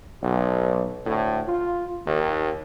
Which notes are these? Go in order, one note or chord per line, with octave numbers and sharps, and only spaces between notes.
B1
D2 A2
F4
D#2